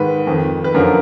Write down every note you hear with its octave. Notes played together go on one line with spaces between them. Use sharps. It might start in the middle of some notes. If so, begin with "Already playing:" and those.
Already playing: G#2 D#3 B4
F2 D#3
B4
F#2 D3 F3 A#4